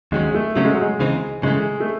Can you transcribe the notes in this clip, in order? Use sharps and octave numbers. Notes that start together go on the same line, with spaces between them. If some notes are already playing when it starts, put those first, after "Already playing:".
D#2 D#3 F#3 G#3 C#4
A3
C#3 F#3 A3 C#4
G#3
F#3
G#3
C#2 C#3 E3 C4 D#4
C#3 E3 G#3 A3
A3